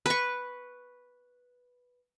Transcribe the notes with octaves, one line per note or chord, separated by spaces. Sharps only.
B4 C#6